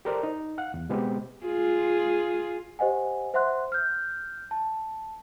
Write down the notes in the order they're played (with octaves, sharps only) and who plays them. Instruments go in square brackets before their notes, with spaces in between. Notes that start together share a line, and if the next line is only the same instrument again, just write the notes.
[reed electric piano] G4 A4 A#4 C5 D5
D#4
F5 F#5 F#6
E2
B2 G#3 B3 C4 G4
[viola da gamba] F4 G#4
[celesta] G4 C5 D#5 F#5 G#5
C5 E5 F#5 C6 F#6
F6 G6
A5